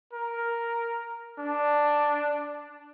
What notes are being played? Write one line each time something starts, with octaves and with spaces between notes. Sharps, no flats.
A#4
D4